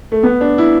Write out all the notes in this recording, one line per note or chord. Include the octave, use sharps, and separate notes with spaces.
A3
B3
D4
E4